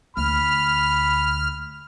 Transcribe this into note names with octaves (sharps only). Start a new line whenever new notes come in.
D2 B5 F6